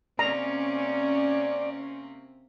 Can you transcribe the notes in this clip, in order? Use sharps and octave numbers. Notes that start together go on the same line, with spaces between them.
C3 A#3 C4 C#4 D5 A#5